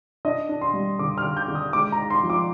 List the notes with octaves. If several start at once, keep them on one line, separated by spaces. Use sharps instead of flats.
D4 D#5
D4
C6
G3
D3 D6
F6
D3
G6
D3
D#6
G#3 D6
A#5
D#4
C6
F3
D6